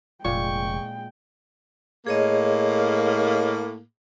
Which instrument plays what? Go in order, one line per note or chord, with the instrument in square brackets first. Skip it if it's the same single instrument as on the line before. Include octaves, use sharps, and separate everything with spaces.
[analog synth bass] F1 [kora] A#2 [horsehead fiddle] G#3 G5 [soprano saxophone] C#6
[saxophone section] A2 A#3 [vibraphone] G#4 C#5 D#5